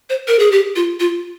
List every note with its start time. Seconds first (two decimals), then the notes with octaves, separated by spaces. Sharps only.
0.10 C5
0.28 A#4
0.39 G#4
0.52 G4
0.76 F4
1.00 F4